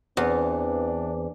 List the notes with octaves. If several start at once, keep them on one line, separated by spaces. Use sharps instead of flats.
E2 E3 C4 D4